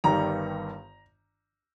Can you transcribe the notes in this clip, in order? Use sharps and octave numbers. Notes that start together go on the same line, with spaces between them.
G1 G2 D#3 G3 A#5